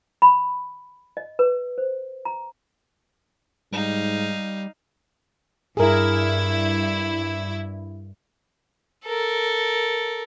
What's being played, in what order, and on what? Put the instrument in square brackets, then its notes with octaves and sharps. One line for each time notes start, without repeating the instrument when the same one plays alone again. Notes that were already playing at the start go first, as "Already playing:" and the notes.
[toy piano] B5
D#5
B4
C5
A#5
[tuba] G#2 [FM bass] G3 [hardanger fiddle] D#4 F5
[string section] G2 E4 [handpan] G#4 A#4
[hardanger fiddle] A4 A#4